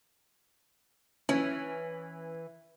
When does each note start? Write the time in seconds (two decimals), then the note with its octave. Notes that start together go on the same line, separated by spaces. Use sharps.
1.29 E3 C#4